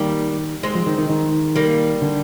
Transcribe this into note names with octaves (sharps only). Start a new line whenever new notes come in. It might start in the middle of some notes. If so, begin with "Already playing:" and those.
Already playing: D#3 G3 A#3
G#3 C4
F3
D#3
D#3
D#3
G3 A#3
D3